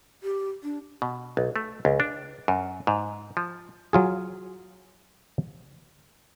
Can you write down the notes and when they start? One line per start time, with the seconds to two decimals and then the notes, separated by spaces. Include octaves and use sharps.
0.23 G4
0.63 D4
1.02 B2
1.37 B1
1.56 A3
1.85 C#2
2.00 D4
2.48 F#2
2.87 G#2
3.37 F3
3.93 F#3 F4 G#4